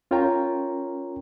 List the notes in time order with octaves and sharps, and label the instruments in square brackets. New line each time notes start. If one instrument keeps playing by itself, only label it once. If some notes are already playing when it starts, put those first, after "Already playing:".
[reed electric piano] C#4 F4 A#4 C#5 G5 A#5